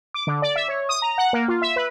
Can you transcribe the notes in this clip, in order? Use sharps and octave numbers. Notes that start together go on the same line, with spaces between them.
D6
D3
D5
E5
C#5
D#6
A#5
F#5
A#3
F4
E5
B4